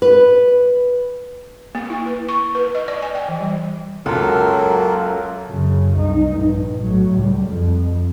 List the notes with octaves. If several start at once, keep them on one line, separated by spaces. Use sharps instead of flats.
B4
A#3
E4
B4
C#6
B4
D#5
D5
G#5
G5
E3
G3
C#2 F#2 F#3 A#3 F4 A4 A#4
F#2 C#3
C2 D#4
A#1 G2
A2 F#3
C#2 G3
F2